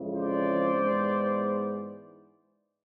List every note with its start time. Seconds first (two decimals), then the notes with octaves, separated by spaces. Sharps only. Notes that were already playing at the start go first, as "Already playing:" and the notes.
Already playing: F2 C#3 E3 G#3
0.15 C5 D5
0.73 G#2 E3 G#3 B3